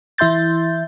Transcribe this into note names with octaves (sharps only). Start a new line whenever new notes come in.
E3 E4 E5 C6 G6 A6